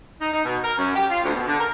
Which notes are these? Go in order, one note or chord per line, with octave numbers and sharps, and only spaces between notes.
D#4
D#4
B2
A#4
F#2
G4
F4
D2
B2
D3
A#4